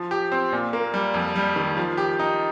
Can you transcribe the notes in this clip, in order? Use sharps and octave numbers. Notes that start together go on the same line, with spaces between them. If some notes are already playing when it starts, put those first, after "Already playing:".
Already playing: F3
G4
C4
A#2
A#3
G3
F2
G3
D#3
F3
G4
D#4